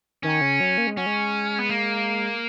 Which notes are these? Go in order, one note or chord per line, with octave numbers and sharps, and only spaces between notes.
D#3 C#4
C#3
F#3
A#3
G#3
F#3 C#4
G#3
B3
A#3